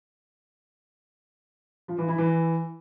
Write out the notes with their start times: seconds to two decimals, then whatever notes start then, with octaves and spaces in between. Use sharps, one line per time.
1.88 F3
1.98 E3
2.08 E4
2.18 E3